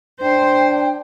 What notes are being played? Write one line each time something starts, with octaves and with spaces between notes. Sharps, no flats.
D4 C5 G5